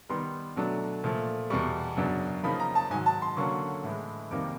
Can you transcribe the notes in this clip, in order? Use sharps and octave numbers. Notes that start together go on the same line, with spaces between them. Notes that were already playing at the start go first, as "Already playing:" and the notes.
D#3 G3 B3 C6
B2 F#3 A3 D4
A#2 F3 A3
E2 B2 G3 C#6
F#2 C#3 F#3 B3 D4
C#3 F3 A#3 D#4 B5
A#5
A5
G#2 D#3 F#3 G#5
A5
C6
D3 F#3 A#3 C#4 C#6
A2 E3 G#3
F2 C3 D#3 G3 A#3 D6